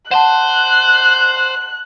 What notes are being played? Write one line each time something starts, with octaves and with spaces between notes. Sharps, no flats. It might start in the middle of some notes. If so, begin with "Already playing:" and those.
C5 F#5 A5 C6 F#6